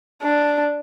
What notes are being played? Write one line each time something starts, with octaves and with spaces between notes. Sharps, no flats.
D4